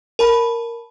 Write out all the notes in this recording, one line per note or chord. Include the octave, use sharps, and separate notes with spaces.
A#4 A5 B5